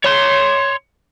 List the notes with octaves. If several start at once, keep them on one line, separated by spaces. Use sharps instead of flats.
C#5 C6